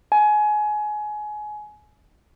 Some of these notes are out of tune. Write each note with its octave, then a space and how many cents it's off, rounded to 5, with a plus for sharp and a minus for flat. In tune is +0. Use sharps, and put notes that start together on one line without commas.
G#5 +25